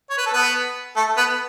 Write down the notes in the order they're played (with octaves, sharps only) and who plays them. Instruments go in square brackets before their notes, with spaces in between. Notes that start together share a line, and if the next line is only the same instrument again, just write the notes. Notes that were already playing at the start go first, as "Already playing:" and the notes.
[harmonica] C#5
B4
A4
B3 B4
A3 A4
B3 B4